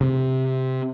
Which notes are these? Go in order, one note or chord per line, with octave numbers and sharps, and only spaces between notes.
C3 C4